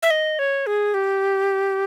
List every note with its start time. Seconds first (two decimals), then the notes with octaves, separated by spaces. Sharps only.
0.03 E5
0.11 D#5
0.39 C#5
0.67 G#4
0.94 G4